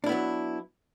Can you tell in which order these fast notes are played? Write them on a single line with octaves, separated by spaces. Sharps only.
D4 E4 B3 F#3